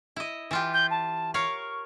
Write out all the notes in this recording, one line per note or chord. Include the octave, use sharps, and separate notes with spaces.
E4 D#5
E3 F4 G4
G6
A5
A#4 C#5 F5 C#6